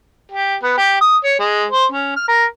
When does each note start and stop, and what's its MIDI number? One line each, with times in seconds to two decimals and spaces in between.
0.32 0.56 67
0.63 0.74 59
0.77 0.99 67
1.01 1.16 87
1.24 1.36 73
1.39 1.66 56
1.71 1.85 72
1.92 2.16 61
2.16 2.27 89
2.28 2.46 70